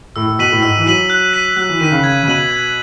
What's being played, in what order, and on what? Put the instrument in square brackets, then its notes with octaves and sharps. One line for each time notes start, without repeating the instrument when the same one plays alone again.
[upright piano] A2 [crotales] E6
[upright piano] A2
[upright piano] B2 [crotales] B6 D#7 F#7
[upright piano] A2
[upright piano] G#2 [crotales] E6
[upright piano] E3
[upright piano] F#3 [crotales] B6 D#7 F#7
[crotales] F#6
B6 D#7
[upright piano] F#3 [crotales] F#6
[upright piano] E3
[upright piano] D#3 [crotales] B6 D#7
[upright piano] C#3
[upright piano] C#3 [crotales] G#6
[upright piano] C#3
[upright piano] B2 [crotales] D#7 F#7
[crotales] G#6